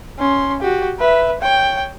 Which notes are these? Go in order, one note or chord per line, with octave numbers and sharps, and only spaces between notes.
C#4 C6
F#4 G4
B4 E5
C#5 G5